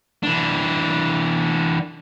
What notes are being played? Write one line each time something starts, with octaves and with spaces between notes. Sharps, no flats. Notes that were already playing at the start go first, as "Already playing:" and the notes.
E3 D4